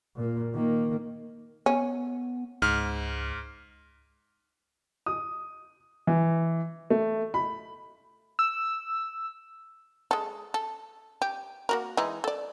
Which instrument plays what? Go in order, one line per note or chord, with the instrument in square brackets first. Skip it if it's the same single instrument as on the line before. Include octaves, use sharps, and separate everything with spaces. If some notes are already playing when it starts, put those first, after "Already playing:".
[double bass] A#2 A#3
D#3 A#3
[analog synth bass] B3 [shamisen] C#4
[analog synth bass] C#2 [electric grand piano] G#2 F6
[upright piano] D#6
E3
A3
B5
[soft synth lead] E6
[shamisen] G#3 A4
A4
G4
A#3 F#4 A#4
E3 G#3 D#4
A4 D5